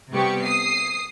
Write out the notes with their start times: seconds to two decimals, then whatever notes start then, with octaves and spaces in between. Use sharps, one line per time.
0.12 C3 G3 B3 G4 C#6
0.42 D#6 C7